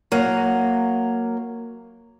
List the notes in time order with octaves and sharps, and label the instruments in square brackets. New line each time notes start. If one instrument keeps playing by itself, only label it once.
[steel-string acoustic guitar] F#3 A#3